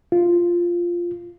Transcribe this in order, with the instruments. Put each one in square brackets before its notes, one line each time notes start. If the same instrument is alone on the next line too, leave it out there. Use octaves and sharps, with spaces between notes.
[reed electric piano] F4